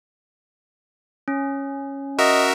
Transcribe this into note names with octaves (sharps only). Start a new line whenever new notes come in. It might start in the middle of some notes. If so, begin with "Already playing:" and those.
C#4
F#4 A#4 D#5 E5